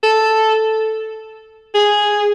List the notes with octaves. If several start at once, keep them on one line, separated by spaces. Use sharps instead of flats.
A4
G#4